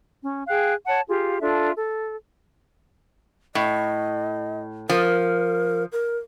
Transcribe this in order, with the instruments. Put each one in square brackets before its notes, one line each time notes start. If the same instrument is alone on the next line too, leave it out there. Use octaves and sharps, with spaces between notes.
[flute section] C#4
G#4 F5 G5 F#6
C#5 F#5 A5
F4 G4 G#4 F5
D4 F4 A4 E5
A4
[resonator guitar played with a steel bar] A2 [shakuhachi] D#5
[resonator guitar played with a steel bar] F3 [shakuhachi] A#4
[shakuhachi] A#4